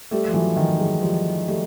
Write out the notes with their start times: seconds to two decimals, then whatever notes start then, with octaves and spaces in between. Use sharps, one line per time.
0.11 G3 A3
0.28 F3
0.34 E3 F#3
0.57 D#3 F3
0.79 F#3 G#3
1.02 F3 G3
1.48 G3 A3